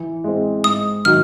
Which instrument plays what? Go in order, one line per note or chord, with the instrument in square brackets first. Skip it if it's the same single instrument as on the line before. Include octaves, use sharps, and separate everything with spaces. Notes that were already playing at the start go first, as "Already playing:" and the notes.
Already playing: [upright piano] E3
G#3 C4
[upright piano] G#2 [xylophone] D#6
[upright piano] D#3 F#3 [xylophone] F6